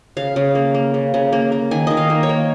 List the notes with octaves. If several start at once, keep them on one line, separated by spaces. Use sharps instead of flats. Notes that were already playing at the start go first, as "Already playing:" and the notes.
C#3 F5
C#3
A#3
A#3
C#3
C#3
A#3
A#3
D#3 G#5
D#3 D#5
F5
A#3
C#5
A#3